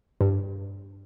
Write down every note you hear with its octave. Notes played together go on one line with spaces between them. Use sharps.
G2